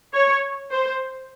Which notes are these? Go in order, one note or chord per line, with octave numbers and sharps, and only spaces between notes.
C#5
C5